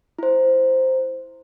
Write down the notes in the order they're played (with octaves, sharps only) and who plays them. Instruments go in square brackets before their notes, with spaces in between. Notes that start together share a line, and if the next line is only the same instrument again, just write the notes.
[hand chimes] E4 C5